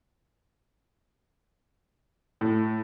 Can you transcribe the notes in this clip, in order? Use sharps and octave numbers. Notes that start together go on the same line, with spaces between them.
A2